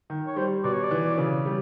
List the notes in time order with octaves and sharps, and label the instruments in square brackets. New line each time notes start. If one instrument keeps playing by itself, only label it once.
[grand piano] D#3
[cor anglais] C#5
[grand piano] G3 [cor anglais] C5
[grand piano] B2 [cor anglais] D5
[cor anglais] C#5
D5
[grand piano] E3
C#3
G3